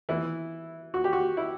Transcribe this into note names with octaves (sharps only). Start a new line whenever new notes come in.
E3 B3 E4
F#4
G4
F#4
E4